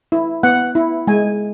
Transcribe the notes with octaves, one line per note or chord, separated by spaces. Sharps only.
E4
B3 F#5
E4
G#3 G#5